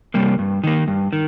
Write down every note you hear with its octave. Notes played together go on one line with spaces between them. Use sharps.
C3 G3 A#3
G2
D#3 A#3
G2
D#3